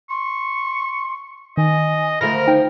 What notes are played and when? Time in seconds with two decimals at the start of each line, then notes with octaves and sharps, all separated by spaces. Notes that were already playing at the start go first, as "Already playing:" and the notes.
0.10 C6 C#6
1.57 D#3 D#5 G#5
2.21 D3 F3 A3 A#4 B5 A#6
2.47 D#4 G5